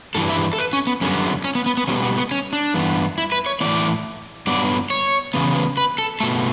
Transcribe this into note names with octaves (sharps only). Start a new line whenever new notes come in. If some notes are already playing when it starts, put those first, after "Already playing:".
G2 E3 G3 A4
E5
A4
B4
C#4
B3
F#2 D3 G3 B3 C#4
C#4
B3
B3
B3
B2 G3 B3 C#4
B3
B3
C#4
D4
G2 E3 B3
E4
B4
C#5
A2 E3 B3 D5
G2 F#3 B3 D5
C#5
C#3 E3 B3
B4
A4
B2 A3 A4